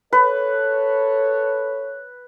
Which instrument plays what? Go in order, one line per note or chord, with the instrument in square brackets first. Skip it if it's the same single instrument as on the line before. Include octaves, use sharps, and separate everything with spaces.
[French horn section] A4 C#5 [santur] B4